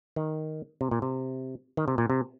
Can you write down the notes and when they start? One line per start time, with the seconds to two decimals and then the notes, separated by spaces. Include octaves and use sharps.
0.16 D#3
0.81 C3
0.91 A#2
1.02 C3
1.77 D#3
1.88 C3
1.98 A#2
2.10 C3